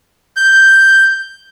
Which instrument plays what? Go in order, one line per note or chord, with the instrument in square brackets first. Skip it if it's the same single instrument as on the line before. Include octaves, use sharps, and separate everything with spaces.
[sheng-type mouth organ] G6